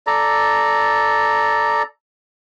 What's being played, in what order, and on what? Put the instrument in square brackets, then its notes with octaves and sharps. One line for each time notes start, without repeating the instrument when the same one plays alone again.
[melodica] A4 D5 A#5